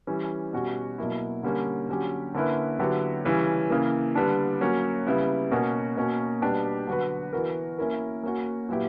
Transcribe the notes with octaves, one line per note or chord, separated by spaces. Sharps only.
E3 G3 C#4
B2 G3 C#4 F#4
B2 F#3 A#3 E4
D3 G3 A#3 C#4
D3 F#3 C#4 G4
D3 A#3 C#4 E4 B4
D3 F#3 B3 E4 G4
C#3 E3 G3 C#4
C#3 E3 A#3
D3 G3 B3 D4
F#3 A#3 C#4
C#3 G3 B3 E4
B2 A#3 C#4 F#4
B2 A#3 C#4 F#4 A#4
B2 G3 B3 D4 G4
D3 F#3 B3 F#4 B4
E3 B3 F#4 A#4
A#3 C#4 E4 A#4
A#3 C#4 F#4
A#2 F#3 B3 E4 G4